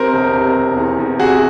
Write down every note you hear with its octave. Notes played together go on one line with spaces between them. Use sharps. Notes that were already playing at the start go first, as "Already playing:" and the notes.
Already playing: C3 A#4 C5
E1
C3
E1
E2
E2
C3 F#4 G#4